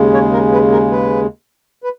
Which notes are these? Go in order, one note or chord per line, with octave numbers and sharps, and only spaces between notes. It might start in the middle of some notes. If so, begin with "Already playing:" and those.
Already playing: D#2 C#3 G#3
C#5
A#4
B4
A#4
B4
B4